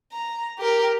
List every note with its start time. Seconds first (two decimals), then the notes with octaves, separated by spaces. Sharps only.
0.12 A#5
0.59 G4 A#4